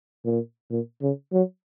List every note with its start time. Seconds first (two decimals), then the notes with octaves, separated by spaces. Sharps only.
0.25 A#2
0.70 A#2
1.02 C#3
1.33 F#3